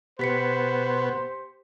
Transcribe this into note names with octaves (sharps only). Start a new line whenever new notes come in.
B2 B3 G4 C5 B6 C#7